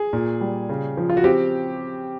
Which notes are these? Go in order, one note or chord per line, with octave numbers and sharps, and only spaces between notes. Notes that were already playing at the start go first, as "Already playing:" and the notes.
Already playing: G#4
A#2
G3
C#3
F3
F4
F#4
C4 G4